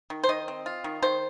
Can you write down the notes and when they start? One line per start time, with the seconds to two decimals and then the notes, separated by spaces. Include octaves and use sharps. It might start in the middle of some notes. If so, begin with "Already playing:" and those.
0.10 D#3
0.24 C5
0.29 D#3 D#5
0.48 C4
0.66 F4
0.84 D#3
1.02 D#3 C5